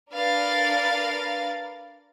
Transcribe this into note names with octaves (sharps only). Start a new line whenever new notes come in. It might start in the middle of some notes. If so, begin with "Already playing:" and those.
D4 A#4 B4 F5 A6